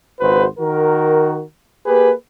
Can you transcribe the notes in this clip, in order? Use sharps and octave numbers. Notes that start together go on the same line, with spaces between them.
G#1 C#2 F#4 B4 C5
D#3 F#4 A#4
A#3 G4 G#4 B4